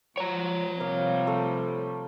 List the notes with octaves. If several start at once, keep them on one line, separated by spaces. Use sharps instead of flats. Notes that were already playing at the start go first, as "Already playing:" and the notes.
F3 C#5 A#5
C3 F3 G3 A#3 F5
A3